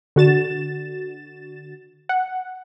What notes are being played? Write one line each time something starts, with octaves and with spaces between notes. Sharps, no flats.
D3 F#4 A6 E7
F#5